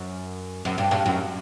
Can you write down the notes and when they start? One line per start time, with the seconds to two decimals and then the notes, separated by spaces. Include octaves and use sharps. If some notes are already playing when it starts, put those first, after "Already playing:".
Already playing: F#2
0.65 F#2
0.78 G2
0.91 G2
1.06 F#2